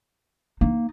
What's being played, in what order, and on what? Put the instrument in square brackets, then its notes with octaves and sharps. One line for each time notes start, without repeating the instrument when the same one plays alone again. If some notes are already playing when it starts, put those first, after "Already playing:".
[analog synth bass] A#3 [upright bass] D#4